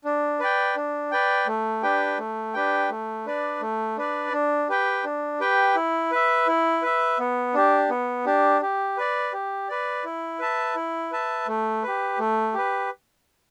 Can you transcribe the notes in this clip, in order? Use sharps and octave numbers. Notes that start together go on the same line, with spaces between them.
D4
B4 D5 G5
D4
B4 D5 G5
A3
D4 G4 B4 G5
A3
D4 G4 B4 G5
A3
D4 B4 D5
A3
D4 B4 D5
D4
G4 B4 G5
D4
G4 B4 G5
E4
B4 E5
E4
B4 E5
B3
D4 G4
B3
D4 G4
G4
B4 D5
G4
B4 D5
E4
B4 E5 A5
E4
B4 E5 A5
A3
G4 B4
A3
G4 B4